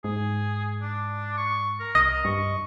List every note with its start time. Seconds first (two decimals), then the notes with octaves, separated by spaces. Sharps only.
0.04 G#2 G#4
0.82 D4
1.37 C#6
1.80 A#4
1.95 C2 D#5
2.25 G2 C#6